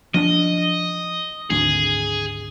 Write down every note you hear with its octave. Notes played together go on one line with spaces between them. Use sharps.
F3 C#4 D4 D#5
G#1 D2 G#4